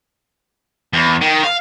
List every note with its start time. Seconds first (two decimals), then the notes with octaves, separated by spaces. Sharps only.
0.93 E2
1.21 D#3
1.44 F5